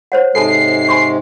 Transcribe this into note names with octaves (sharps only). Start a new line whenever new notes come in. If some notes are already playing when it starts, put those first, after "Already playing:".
C5 C#5 F#5
G#2 C3 G#3 A4 G#5 A5 C7
G#5 C6 C#6